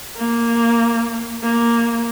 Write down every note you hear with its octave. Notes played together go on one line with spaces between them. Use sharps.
A#3
A#3